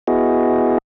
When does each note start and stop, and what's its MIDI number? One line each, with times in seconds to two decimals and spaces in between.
0.08 0.78 59
0.08 0.78 64
0.08 0.78 66
0.08 0.78 68
0.08 0.78 75